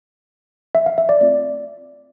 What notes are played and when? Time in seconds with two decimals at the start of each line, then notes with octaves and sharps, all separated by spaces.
0.75 E5
0.86 F5
0.98 E5
1.09 D5
1.21 A3 C4 F4 D5